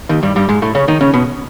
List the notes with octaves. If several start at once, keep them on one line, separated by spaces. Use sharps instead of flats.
D#2 D#3
G2 G3
G2 G3
G#2 G#3
A2 A3
C#3 C#4
D#3 D#4
C#3 C#4
B2 B3